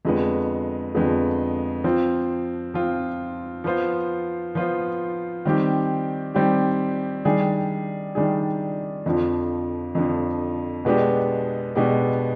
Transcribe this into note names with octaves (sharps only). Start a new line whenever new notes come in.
F2 D3 G#3 B3
F2 D3 G#3 B3
F3 C4 F4
F3 C4 F4
F3 B3 F4 C5
F3 B3 F4 C5
D#3 G3 C4 G4
D#3 G3 C4 G4
D#3 G3 D4 G#4
D#3 G3 D4 G#4
F2 D3 F3
F2 D3 F3
B2 G#3 B3 D4 G4
B2 G#3 B3 D4 G4